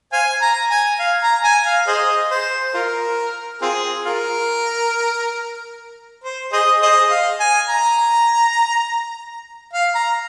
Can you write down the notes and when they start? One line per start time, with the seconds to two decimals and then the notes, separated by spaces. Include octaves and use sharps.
0.12 C5 F5 G#5
0.42 A#5
0.71 G#5
1.00 F5
1.22 A#5
1.44 G#5
1.66 F5
1.87 G#4 C5 D#5
2.31 C5
2.74 F4 A#4
3.62 C4 F4 G#4
4.05 F4 A#4
6.24 C5
6.53 G#4 C5 D#5
6.82 G#4 C5 D#5
7.11 F5
7.40 G#5
7.69 A#5
9.73 F5
9.95 A#5